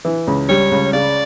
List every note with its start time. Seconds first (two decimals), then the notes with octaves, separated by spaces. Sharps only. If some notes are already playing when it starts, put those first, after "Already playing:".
0.05 E3
0.27 C#2
0.49 G3 C#5
0.71 C#2
0.93 C#3 D5